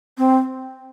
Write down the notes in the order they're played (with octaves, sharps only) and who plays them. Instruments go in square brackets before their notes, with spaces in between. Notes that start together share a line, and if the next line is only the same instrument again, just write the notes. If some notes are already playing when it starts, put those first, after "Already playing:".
[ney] C4